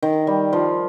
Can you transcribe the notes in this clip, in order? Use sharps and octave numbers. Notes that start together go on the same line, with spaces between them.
D#3
G3
F3